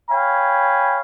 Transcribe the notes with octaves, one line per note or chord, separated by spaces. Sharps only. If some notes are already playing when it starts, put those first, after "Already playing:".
C#5 F5 G5 G#5 B5